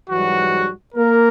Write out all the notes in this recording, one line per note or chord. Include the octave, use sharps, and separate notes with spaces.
G#2 E3 F#3 G3 F#4
A#3 A#4